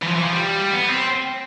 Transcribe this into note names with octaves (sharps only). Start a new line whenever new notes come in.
E3
F3
E3
F3
G3
B3
C4